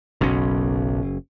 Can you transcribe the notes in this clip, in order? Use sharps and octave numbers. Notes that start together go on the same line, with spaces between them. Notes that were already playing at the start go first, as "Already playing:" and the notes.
F#1 B1 C#4